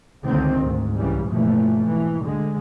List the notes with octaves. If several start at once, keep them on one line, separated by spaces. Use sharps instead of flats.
C#2 D3 D#3 C4
D2 G#2
C2 C#3 E3 G3
G2 B2 E3 F3 A3 A#3
G#2 E3
D2 D3 G#3